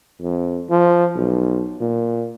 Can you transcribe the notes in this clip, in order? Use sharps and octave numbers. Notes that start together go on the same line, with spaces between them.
F2
F3
B1
A#2